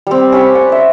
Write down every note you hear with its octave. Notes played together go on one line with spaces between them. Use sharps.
G3 C4
C#4 G4 B5 C#6
D5 F#5 C6
C#5 E5